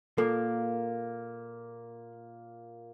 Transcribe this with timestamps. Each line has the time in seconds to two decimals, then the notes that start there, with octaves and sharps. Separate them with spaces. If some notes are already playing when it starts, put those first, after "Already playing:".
0.18 A#2 A#3 A4